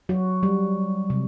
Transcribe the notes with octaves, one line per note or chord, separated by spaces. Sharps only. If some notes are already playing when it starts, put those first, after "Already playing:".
F#3 F#4
G3
C3